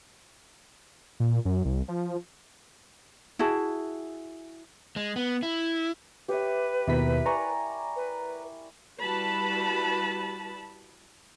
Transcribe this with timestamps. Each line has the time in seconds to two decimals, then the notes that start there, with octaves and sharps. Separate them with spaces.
1.20 A#2
1.45 F#2
1.65 C2
1.88 F3
3.39 E4 F#4 G#4 A5
4.96 G#3
5.16 B3
5.43 E4
6.28 G4 B4 C#5 E5
6.87 D#2 B2 E4 A#4 B6
7.26 D5 G#5 A#5 C#6
7.96 B4
9.01 G3 E4 F#4 B4 A5 B5